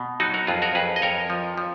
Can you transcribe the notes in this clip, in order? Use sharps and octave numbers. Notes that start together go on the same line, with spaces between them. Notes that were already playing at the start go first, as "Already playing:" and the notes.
Already playing: B2
F#3 D#4 F#4
F#4 A#4
F2 F4 G#4
F#4 A#4
F2 G#4 B4
D#5
F2 A#4 C#5
F3
F3